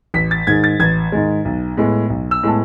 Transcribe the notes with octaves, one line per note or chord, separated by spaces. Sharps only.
A1 B6
A6
G#2 D#3 G#3 G#6
A6
A1 G#6
G#2 D#3 G#3
B1
A2 G#3 B3
B1
E6
A2 G#3 B3 A5